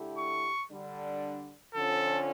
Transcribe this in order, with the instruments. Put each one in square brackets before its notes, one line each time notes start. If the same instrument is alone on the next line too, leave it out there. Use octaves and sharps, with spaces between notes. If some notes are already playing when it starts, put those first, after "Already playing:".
Already playing: [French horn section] D3 A3 E4 G4
[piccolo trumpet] C#6
[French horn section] D3 G3 D4
[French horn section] D3 F3 C#4 [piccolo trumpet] A4